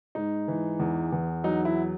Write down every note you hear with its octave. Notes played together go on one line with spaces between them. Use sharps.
G#2 D#4
E3
E2
E2
F#3 D#4
E4